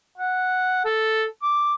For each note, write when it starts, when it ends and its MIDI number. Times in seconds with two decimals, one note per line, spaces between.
0.18 0.82 78
0.85 1.25 69
1.42 1.74 86